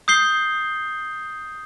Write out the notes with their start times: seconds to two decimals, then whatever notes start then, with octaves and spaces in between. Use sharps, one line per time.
0.08 D#6 G6 C7 G7